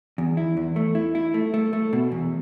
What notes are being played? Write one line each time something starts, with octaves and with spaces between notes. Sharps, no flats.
E2
E4
E2
A3
E4
E4
A3
A3
A3
B2
E2